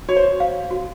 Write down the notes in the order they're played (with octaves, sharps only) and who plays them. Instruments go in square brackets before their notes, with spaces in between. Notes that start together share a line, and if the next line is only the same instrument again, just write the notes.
[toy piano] F#4 [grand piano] C#5
[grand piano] C5
[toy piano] F5
F#4